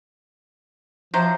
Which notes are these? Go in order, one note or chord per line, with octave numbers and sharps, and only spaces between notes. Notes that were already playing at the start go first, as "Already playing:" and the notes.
C3 F3 F#3 C5